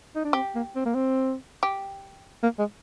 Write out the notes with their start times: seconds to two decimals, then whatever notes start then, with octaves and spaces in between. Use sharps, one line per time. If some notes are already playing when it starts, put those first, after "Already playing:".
0.15 D#4
0.24 D4
0.33 C4 G4
0.55 A#3
0.76 C4
0.86 A#3
0.95 C4
1.63 G4
2.43 A#3
2.59 G#3